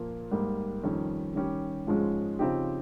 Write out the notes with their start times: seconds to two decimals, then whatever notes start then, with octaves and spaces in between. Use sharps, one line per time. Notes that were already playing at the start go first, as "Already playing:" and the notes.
Already playing: A#2 F3 A#3
0.31 G#2 G3 A#3
0.83 F2 D#3 G3 C#4
1.35 D#3 G3 C#4 G4
1.87 G#2 F3 G#3 C#4 G#4
2.39 C#3 F3 C4 D#4 G4